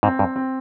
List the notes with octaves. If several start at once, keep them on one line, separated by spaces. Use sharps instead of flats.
G#2 C4
G2
C4